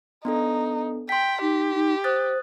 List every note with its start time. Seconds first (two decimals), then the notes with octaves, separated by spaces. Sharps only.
0.25 B3 D4 D#4 A4
1.09 G5 C6 B6
1.42 D#4 G4
1.75 D#4
2.04 C5 D#6 F#6 A6